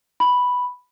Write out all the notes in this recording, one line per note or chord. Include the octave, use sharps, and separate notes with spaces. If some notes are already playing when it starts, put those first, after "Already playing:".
B5